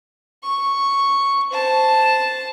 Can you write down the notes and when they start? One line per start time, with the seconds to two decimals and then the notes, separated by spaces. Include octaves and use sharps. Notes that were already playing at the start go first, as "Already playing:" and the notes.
0.43 C#6
1.51 C5 A5